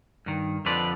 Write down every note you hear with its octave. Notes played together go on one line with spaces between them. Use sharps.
G2 D#3
F2 D3 F3 B4 D5